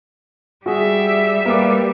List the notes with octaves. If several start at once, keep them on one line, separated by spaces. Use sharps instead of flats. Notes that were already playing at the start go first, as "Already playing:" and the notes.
G3 F#4 G#4 E5
G3 A#3 B4 D6